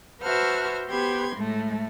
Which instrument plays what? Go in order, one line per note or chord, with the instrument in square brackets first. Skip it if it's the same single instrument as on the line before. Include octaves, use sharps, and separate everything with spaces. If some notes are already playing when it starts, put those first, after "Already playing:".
[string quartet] F#4 B4 C5 E5 A5 F6
B3 G4 C5 B5 C6 G#6
A2 G#3 A3